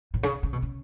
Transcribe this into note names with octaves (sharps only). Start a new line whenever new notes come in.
A2
C#3
C#3
B2
C#3